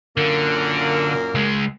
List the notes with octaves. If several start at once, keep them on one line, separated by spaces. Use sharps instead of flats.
F#2 A#2 D3 A#3
C#2 G#3